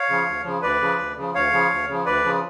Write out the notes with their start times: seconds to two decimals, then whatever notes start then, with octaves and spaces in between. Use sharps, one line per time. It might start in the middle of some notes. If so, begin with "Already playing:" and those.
Already playing: C#5 F5
0.09 C#3 F3
0.26 D2
0.44 C#3 F3
0.62 D2 B4 D5
0.81 C#3 F3
0.99 D2
1.17 C#3 F3
1.34 D2 C#5 F5
1.52 C#3 F3
1.71 D2
1.89 C#3 F3
2.06 D2 B4 D5
2.24 C#3 F3